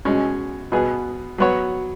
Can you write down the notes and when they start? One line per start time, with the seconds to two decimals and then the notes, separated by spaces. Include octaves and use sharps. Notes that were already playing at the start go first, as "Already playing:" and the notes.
0.05 B2 G#3 C#4
0.72 B2 B3 G#4
1.38 F#3 B3 F#4 C#5